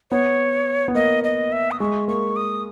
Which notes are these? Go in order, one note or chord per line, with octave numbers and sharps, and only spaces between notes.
B3 C#5
B3
A#3 D#5
D#5
E5
D#6
G#3 C#6
A#3 C#6
D#6